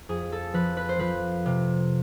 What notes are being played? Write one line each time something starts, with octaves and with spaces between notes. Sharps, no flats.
F2 G#4
A4
F3 B4
B4
C5
F3 B4
C3